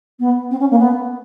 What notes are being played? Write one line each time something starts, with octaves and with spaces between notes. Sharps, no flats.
B3
C4
C#4
A#3
B3